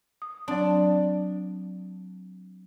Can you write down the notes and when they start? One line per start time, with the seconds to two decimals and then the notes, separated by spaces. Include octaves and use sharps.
0.22 D#6
0.48 F#3 C4 D4